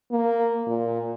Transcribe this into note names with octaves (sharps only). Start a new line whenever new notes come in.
A#3
A#2